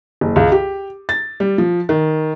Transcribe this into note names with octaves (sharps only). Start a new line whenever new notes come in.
F#1
C#2
G4
A6
G3
F3
D#3